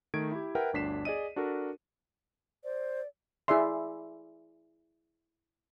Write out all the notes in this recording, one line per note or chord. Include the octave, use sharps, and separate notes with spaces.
D#3 A3 G#6 D7
E4 G4
A#4 B4 E5 F#5 G5
G1 D2 D4 B6 C7 E7
G#4 D5 D#5 D#7
D4 F#4 A4 A#4
C5 D5
E4 G#4 D5 E5 C6